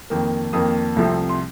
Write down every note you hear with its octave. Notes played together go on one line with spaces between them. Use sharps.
F2 D#3 A#3
F2 D#3 A#3 D#6
C2 C3 F3 A3 C4
C6